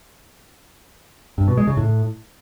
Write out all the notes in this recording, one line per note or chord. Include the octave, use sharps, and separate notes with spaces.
G2
B2
G#3
C#3
A2